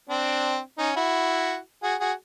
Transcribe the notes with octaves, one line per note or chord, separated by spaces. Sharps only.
C4 D4
C#4 D#4
E4 F#4
F#4 G#4
F#4 G#4